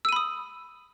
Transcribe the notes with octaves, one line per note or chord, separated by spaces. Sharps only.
B5 D#6 E6 D#7